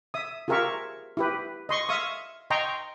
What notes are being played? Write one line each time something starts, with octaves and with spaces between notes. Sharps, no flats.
E5 D#6
F4 G4 G#4 A#4 E5 C#6
E4 G4 B4
D#5 C6 C#6
E5 F5 C#6 D#6
D#5 G5 A#5 C6 C#6